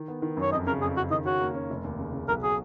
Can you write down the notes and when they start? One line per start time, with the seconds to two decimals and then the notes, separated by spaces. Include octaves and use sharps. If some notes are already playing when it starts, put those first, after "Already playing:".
Already playing: D#3
0.08 B3
0.22 D#3
0.37 F#2 C#5
0.52 F2 D#5
0.67 C#3 A#4
0.81 F2 G#4
0.96 C#3 F#4
1.10 D#3 D#5
1.25 C#4 F#4
1.41 A#3
1.55 C#4
1.70 F1
1.84 D#2
1.99 C#3
2.13 C#3
2.28 B1 A#4
2.42 F#3 G#4